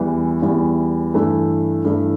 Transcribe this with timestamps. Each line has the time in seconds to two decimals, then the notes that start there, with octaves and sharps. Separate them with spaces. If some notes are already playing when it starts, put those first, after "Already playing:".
Already playing: E2 E3 G3
0.42 E2 E3 G3
1.14 G2 E3 A3 E4
1.84 G2 E3 A3 E4